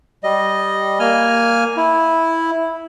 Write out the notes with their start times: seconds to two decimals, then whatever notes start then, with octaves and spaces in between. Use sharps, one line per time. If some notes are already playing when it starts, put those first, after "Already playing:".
0.24 G3 D#5
1.00 A#3 G#5 F6
1.77 E4